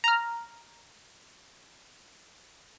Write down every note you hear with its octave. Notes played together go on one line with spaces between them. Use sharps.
A#5 F6